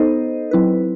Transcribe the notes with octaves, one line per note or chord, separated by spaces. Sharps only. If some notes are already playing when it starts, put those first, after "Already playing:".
Already playing: B3 D#4 A4 C5 D#5
F#3 C4 E4 B4